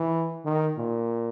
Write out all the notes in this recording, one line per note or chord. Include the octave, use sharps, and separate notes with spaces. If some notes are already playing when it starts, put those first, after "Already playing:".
Already playing: E3
D#3
A#2